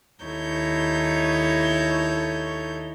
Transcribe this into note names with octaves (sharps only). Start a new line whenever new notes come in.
D#2 D#4 E4 A4 C#5 G6